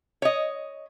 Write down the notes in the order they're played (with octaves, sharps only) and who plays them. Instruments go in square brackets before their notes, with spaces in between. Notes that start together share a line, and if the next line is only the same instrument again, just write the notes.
[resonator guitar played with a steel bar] C#5 D#5